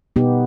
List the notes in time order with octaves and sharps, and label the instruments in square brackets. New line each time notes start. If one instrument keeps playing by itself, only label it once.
[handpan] B2 B3 D#4 G4